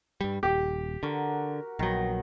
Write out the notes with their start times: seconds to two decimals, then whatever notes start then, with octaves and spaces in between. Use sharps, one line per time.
0.21 G2 G3
0.43 D#1 G4
1.03 D3 F#4 A#4
1.79 A#1 D#3 F#3 B3